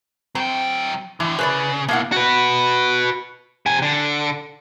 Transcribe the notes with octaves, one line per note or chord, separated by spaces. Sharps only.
F#3 C4 G5
A2 D3 E3
C#3 B4 C5 D5
B2 A#3 E4 F5 F#5
F#4 B4
C3 G#5
D3